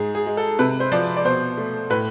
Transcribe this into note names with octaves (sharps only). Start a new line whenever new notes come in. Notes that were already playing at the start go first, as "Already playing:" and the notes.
Already playing: G#2 G#4
G#4
G#3
A4
C3 B4
C5
F3 D5
D5
B2 C5
A3
A2 B4